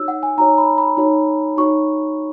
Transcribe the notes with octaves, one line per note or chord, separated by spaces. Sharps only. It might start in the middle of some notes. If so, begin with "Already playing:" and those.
Already playing: D#4 F#4 C#5 E6
F#5
G#5
D#4 F#4 C#5 A#5
B5
B5
D#4 F#4 C#5
D#4 F#4 C#5 C#6